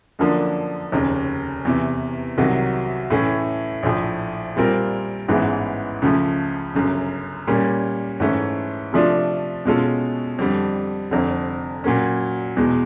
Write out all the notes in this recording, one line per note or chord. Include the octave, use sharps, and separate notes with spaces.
F#2 D3 F3 A#3 D4
F1 D#2 C#3
E2 C3 E3
C2 C3 D#3 F#3
A2 E3 A3 C#4
A#1 A2 F3
A#2 G3 C4 F4 A#4
A1 G#2 E3 G#3 B3
C#2 C#3 F3 A3
G1 F#2 C#3
A#2 G3 A#3 C#4
G#2 E3 A3 C#4
C3 F3 A3 D4 F4
B2 G#3 C#4 F4 A4
F2 D3 G3
F1 F2 D3
A#2 F#3 A#3 C#4
E2 B2 G#3